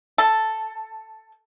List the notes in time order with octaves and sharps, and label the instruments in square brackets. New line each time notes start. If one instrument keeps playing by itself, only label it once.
[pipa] A4